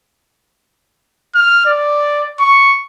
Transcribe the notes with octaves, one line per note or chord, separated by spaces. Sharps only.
F6
D5
C#6